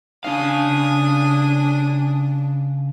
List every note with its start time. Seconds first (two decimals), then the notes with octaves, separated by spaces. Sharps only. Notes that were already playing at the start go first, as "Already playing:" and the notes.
0.24 C#3 D4 F5 G#5 D#6